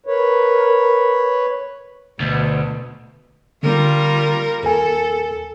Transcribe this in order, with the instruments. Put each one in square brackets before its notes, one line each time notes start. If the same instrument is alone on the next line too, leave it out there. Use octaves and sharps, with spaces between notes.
[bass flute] A#4 [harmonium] B4 C#5
[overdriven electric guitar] D2 [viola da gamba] B2
[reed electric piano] D3 [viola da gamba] G3 F4 A#4
[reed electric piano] D#2 A#4 G#5 [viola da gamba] A4